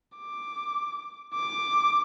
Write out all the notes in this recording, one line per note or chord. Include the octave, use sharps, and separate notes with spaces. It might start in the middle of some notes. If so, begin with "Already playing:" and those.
D6
D6